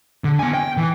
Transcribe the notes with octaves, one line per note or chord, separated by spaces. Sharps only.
D3
B3 G#5
G5
E3